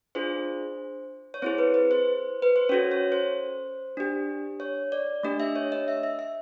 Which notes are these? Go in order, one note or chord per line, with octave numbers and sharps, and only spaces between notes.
D4 F4 G#4 C5
C#5
C4 E4 G#4 C5
B4
B4
C5
B4
C5
C#4 F#4 A4 C#5
C#5
C5
D4 G4
C#5
D5
A3 D4 G4 D#5
E5
C#5
D#5
E5
E5
E5